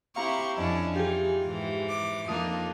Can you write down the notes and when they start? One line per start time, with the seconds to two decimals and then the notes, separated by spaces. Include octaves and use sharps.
0.16 C4 E4 G4 F5 A#5 C#6
0.58 F2 C#4 D4 E4 D#5 A5
0.96 E3 D#4 F4 G4 G#4
1.44 G#2 E3
1.90 D6
2.28 F2 A#3 D4 D#4 F4 D#6